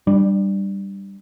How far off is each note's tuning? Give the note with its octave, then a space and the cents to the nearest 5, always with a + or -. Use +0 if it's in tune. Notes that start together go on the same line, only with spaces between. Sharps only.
G3 +0 D4 +25